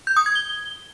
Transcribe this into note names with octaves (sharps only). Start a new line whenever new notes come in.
G6
D#6
G#6
G7